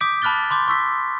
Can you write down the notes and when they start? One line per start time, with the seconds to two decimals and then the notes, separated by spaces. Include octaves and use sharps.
0.01 D6 D#6 G6 B6 D7
0.22 A5 B5 F6 F#6 A6 G7
0.50 B5 C6 D6 G6
0.68 C#6 E6 B6